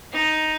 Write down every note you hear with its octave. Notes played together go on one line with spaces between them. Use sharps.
D#4